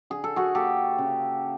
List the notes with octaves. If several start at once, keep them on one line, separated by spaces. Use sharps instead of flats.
D3 G#4
A4
F#4 G#4
A#3 G4 A4
C#3